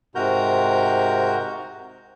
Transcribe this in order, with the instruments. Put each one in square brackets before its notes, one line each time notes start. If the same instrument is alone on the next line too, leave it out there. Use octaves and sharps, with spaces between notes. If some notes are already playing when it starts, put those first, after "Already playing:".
[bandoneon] G#2 C3 F#4 A#4 A#5 G6